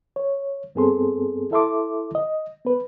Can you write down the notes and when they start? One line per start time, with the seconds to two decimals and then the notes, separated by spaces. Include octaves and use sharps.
0.16 C#5
0.75 G2 B3 C4 G#4 A4 C6
1.51 E4 A4 E5 A5 C6 D6
2.15 D#5
2.65 B3 B4